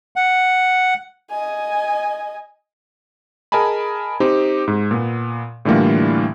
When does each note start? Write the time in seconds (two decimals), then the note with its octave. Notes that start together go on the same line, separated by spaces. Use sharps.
0.16 F#5
1.31 D#5 G#5
3.52 G#4 A#4 D#5 G#5 A5 B5
4.20 C4 D#4 G4 C5
4.68 G#2
4.91 A#2 B3
5.65 A2 D3 E3 G3 A#3 F4